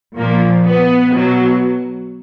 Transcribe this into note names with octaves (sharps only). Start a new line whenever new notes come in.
A#2 F3 A#3
B3
B2 F#3